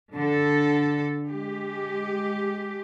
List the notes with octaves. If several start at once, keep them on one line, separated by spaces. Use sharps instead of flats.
D3 A4
G#3 G4